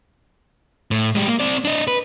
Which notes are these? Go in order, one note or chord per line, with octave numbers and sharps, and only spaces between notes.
A2
G#3 G4
A#3
C4 D5
D4 D#5
B4